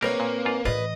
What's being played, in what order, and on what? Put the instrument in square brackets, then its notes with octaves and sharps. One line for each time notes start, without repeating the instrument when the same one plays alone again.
[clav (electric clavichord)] B1 G3 A#4 [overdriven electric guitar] A#3 [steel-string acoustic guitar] C4 B4 C#5
[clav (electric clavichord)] A#2
G#2 F4
[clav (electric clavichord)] A#1 F4 [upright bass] A2 E3 [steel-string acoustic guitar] B4 [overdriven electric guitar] D#5